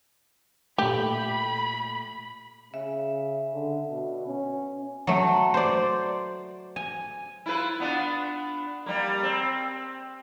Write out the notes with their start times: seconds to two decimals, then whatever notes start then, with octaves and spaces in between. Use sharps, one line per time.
0.78 A#2 A3 G4 B5
2.74 C#3 E5
3.53 D3
3.90 B2
4.27 C#4
5.07 F#3 A3
5.54 C5 D5
6.76 G#5
7.46 E4 F4 B4
7.80 B3 D4 F4
8.86 G3 A#3
9.23 C4